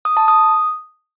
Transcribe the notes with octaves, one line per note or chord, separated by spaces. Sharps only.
D#6
A5
D#6